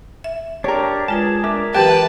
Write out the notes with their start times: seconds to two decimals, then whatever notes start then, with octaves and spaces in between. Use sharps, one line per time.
0.24 E5
0.64 D4 G4 A#4 C#5
1.08 G#3 F4 G#4 B4 A5
1.44 D4 A#4 E5 D6
1.74 E3 F#3 F#4 G4 B4 G5 A5